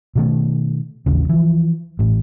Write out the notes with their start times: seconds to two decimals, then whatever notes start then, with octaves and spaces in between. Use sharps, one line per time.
0.15 B2 D#3 A3
1.06 A1 D#2 C#3
1.29 E3 F3
1.99 A1 A2